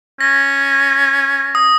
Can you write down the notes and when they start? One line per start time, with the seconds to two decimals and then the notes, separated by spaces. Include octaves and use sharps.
0.20 C#4 A#6
1.55 D#6